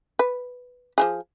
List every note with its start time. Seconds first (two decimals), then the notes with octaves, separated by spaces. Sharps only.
0.19 B4
0.98 F3 G4 G#4